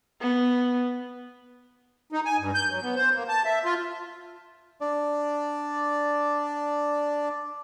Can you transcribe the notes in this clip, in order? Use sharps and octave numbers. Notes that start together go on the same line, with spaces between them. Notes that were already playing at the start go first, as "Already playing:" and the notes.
B3
D#4
G#5
G2
G6
F#3
B3
C5
A#3
A5
E5
F4
D4 D5